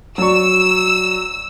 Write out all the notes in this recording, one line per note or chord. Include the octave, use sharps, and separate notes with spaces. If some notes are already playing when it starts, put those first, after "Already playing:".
F#3 D5 C#6 E6